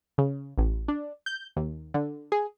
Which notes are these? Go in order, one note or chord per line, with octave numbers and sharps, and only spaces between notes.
C#3
A1
D4
G6
D#2
D3
G#4